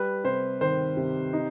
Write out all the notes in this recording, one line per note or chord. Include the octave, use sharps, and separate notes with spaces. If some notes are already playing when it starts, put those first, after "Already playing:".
Already playing: G3 B4
C3 C5
D#3 C5
C3
D#4